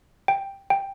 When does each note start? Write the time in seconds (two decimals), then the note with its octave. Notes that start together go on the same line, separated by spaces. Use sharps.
0.28 G5
0.70 G5